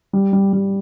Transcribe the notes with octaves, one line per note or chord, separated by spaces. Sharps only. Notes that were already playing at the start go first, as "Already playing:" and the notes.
G3
G3
G3